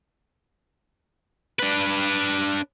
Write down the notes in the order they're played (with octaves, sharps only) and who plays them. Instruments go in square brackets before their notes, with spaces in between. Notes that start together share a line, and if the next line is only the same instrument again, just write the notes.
[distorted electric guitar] D4 B4